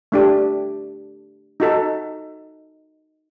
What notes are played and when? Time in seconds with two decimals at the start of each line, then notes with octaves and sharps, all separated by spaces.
0.12 A3 D4 G4
1.60 D#4 F#4 A4